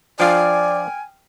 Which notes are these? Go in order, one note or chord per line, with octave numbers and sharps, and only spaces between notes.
F3 D4 F4 D5 G5 G#5 F6